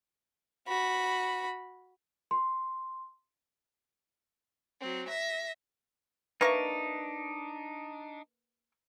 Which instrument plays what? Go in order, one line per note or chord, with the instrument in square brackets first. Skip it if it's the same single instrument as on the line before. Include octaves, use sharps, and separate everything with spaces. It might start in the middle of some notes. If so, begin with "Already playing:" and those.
[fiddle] F#4 B5
[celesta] C6
[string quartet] F#3 C4
E5 A#6
[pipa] A#3 C#6 [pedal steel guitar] D4 D#4 [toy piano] B4 E5